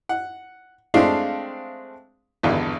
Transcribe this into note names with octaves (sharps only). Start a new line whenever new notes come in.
F#5
G#3 A3 C4 D4 F5
G#1 E2 G2 D3